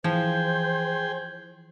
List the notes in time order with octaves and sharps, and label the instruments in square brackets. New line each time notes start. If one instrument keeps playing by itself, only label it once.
[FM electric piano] E3 [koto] F3 [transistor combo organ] G#4 G5 [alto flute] C5